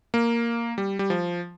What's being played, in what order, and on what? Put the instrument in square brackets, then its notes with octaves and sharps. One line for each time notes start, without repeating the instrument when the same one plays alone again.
[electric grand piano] A#3
G3
G3
F3